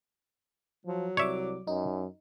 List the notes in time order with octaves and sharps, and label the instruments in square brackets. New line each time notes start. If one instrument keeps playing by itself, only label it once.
[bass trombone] F3 [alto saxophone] F#3
[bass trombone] C2 [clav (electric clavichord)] C#5 E5 [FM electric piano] D5 D6
[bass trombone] F#2 [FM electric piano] D#4